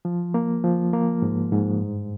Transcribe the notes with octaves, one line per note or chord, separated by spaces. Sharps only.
F3
A#3
F3
A#3
G#2
G#2
G2